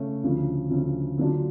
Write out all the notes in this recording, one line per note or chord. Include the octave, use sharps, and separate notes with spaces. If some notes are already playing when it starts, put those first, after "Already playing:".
Already playing: C#3 A3 C#4
D2 C#3 F3
D2 C#3 F3
D3 F#3 A#3 D4 F4